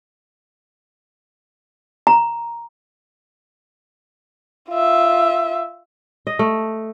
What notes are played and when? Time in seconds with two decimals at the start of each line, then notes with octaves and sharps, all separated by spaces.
2.07 A#5
4.70 F4 E5
6.27 D#5
6.39 A3